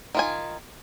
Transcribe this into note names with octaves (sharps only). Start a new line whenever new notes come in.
D#3 F4 G#5